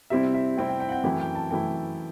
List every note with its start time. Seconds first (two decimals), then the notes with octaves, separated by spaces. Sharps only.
0.10 C3 G3 C4 E4 E5
0.34 E5
0.57 C3 G3 C4 E4 G5
0.69 G5
0.80 G5
0.89 F#5
0.92 G5
1.04 F#2 E3 A3 E4 G5
1.20 G5
1.35 A5
1.51 F#2 E3 A3 E4 G5